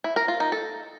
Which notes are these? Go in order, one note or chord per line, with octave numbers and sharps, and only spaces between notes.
E4
A#4
F4
D#4
A4